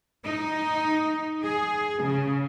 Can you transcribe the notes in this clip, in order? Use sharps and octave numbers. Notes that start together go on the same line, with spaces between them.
D#4
G#4
C#3